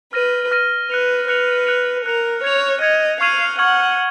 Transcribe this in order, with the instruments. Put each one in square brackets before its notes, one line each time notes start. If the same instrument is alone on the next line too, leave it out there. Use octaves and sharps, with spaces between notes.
[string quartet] B4 [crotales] F6 A#6 D#7
[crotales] F6 A#6 D#7
[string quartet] B4 [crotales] F#6 C#7 F7
[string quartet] B4 [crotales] F#6 C#7 F7
[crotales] F#6 C#7 F7
[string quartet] A#4 [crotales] F#6 C#7 F7
[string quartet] C#5 [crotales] G#6 C#7 F7
[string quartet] D#5 [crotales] G#6 C#7 F7
[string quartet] F5 [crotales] C#6 F6 G#6 D#7 F#7
[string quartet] F#5 [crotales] C#6 F6 G#6 D#7 F#7